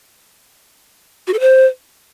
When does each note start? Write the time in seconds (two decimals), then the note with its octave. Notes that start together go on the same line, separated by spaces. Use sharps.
1.27 F#4
1.34 A4
1.40 C5